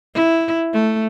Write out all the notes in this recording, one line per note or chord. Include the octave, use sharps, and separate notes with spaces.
E4
A3